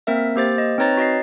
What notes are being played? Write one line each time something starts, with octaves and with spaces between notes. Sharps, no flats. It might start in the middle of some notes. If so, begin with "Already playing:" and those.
A#3 C4 A#4 E5
A#3 G4 C5 A6
D#5
C4 D#4 B4 C#5 A#5 A6
F#4 C#5 D#5 A6 C7